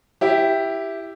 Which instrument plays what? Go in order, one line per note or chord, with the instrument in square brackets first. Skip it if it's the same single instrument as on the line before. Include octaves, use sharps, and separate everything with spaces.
[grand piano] E4 G4